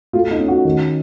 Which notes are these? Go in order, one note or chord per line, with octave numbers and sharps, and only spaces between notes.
A3 F4
D#4
C#4
F#4
D#3